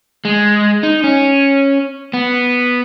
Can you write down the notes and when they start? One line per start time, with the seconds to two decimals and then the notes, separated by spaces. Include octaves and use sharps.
0.25 G#3
0.83 D#4
1.04 C#4
2.13 B3